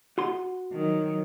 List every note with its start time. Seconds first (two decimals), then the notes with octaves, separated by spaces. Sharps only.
0.18 F#4 C6
0.73 D#3 F#3